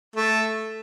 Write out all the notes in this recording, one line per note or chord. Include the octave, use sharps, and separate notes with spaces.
A3